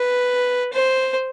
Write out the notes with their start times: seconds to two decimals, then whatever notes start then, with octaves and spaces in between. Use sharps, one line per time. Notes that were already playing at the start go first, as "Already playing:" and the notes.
Already playing: B4
0.73 C5